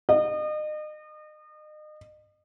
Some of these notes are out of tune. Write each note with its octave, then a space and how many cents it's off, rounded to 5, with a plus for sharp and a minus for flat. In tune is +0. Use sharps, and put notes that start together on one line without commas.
D#5 -35